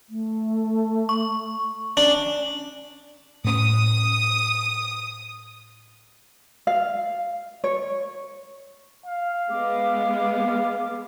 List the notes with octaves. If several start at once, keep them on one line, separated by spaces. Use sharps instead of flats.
A3
C#6
C#4 D4
A2 C#4 D#6
F5
C#5
F5
G#3 B3 D6